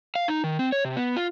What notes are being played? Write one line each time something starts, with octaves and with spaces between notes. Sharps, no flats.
F5
D#4
D#3
C4
C#5
C3
B3
F4